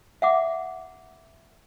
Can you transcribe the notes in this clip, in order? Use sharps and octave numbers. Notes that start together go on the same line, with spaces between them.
E5 F#5 D6